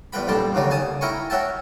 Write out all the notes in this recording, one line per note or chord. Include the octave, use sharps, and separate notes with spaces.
E2 G3 B4 G5 B5
A#1 F2 G3 G5 A5
D#2 C#3 F#3 D5
G#5 A5 D#6
E4 A#4 G5 G#5 C#6
F#4 C#5 E5 G5 A5